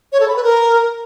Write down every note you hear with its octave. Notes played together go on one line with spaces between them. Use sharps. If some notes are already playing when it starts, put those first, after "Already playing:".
C#5
A4
B5
B4
A#4